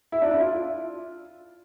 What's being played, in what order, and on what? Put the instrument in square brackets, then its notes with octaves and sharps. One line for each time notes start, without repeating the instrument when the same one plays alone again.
[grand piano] E4
D4
E4
F4